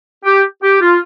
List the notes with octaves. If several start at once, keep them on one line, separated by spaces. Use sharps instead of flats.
G4
G4
F4